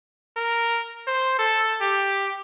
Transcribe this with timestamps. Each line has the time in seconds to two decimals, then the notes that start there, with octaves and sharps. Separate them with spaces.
0.37 A#4
1.07 C5
1.39 A4
1.81 G4